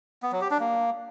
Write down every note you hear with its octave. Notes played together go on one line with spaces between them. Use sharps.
B3
F#3
G4
D4
A#3